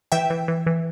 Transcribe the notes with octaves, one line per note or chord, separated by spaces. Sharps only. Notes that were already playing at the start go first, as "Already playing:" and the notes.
E3 E5 G5
E3
E3
E3